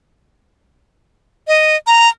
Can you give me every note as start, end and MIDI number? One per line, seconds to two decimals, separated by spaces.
1.48 1.76 75
1.87 2.09 82